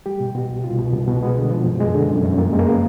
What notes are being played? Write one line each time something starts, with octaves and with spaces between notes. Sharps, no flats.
G3 G4
B2
B2 F#4
C2
C2 F4
B2
C2
B2
G#3 B3
D3
F3
F#2
G#3
D3
F#2
F#2
F2 A#3
G#3
A#3
C#3 B3